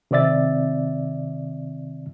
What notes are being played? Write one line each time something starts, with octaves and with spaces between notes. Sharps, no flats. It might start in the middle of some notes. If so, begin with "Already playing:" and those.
C3 D#3 C4 D5 E5 A6